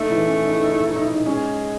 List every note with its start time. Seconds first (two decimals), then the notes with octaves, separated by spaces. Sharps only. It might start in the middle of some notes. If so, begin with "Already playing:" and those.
Already playing: A3 D#4
0.10 E3 E4
0.26 C#4
0.43 D#4
0.51 E4
0.61 D#4
0.69 E4
0.78 D#4
0.87 E4
0.96 D#4
1.05 E4
1.14 D#4
1.26 G#3 C#4